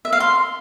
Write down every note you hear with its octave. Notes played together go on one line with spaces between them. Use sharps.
E5
F5
C6